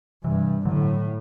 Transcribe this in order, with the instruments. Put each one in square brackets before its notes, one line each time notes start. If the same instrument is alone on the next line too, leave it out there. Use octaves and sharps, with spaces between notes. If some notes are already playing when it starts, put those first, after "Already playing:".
[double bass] G2 [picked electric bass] C3 E3
[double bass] A2 [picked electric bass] D3 F#3